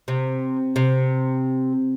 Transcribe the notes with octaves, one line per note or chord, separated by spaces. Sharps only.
C3
C3